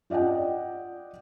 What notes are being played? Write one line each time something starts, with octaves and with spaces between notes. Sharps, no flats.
F4 D5 D#5 F#5 G5